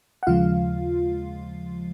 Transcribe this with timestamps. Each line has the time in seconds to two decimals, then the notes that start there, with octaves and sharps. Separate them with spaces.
0.23 F#5
0.27 D#2 C#3 F3 G#3 F4 F5